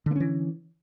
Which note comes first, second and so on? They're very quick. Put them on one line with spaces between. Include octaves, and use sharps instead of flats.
D3 A#3 C#4 E3